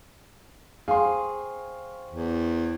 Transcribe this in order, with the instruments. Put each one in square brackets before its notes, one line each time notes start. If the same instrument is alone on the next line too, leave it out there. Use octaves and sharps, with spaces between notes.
[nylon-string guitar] G#4 [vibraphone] C5 G5 C#6 [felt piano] F5 C6
[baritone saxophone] E2